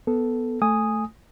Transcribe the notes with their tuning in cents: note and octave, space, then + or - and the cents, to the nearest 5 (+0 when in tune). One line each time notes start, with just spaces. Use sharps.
B3 +0 A4 +0
A3 +0 G#5 -5 D#6 +0